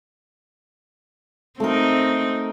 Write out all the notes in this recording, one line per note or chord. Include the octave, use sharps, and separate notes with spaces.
A3 C4 D#4 A#4